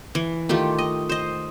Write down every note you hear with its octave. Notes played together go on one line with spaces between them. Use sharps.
E3
D#3 A3 F4 G4
D#5
C5 D#5